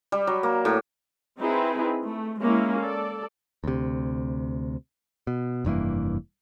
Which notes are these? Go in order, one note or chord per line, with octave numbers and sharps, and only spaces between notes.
G3
F#3
A#3
A2
C4 D#4 E4 G#4 B4
A3
G#3 A#3 C#4 E4
A4 D5
D2 C3
B2
F1 G2 E3 A#3